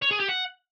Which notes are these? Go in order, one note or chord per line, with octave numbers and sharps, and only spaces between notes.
C#5
G#4
G4
F#5